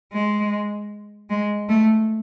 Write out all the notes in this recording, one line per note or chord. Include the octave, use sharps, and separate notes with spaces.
G#3
G#3
A3